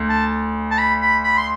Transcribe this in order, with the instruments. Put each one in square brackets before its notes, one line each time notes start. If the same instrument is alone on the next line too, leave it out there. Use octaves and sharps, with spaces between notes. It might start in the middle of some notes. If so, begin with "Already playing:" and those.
Already playing: [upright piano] D2
[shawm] A5
A5
B5
B5
B5
C6